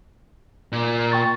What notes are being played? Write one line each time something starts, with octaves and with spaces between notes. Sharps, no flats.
A#2
G5 C#6 A6